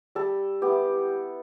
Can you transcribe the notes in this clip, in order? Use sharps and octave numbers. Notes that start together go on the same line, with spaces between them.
G3 A4
B3 E4 G4